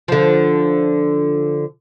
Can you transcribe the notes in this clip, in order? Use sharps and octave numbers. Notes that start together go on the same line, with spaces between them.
D3 F3